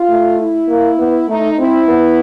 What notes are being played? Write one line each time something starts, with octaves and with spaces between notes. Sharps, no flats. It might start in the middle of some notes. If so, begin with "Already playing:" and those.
Already playing: F4
A3
E4
A#3
B3
A3 D#4
C4 E4
B3